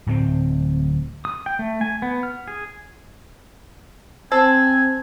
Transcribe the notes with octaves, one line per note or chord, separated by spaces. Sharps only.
D1 A2 A#3 C4
D#6
G5
A3
G#5
B3
F6
G#4
C4 A4 C5 G#5 E6